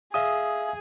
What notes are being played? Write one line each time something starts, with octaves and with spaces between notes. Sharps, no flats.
G#4 E5 F5 D#6